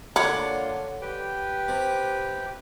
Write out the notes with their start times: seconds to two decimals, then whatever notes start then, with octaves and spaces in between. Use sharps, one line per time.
0.16 D3 A#3 D4 F4 C#5 F#5 B5 D6
1.01 G4 B4 G5
1.68 C3